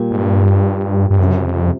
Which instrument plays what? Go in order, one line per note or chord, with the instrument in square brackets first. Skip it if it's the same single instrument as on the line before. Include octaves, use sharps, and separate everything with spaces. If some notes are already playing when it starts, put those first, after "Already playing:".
Already playing: [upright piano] A#2 G3 A#3
[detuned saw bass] G#2
G2
[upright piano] A#2 G3 A#3
[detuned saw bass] G2
[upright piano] C#2 C3 F3 [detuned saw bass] F#2
[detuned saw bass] F2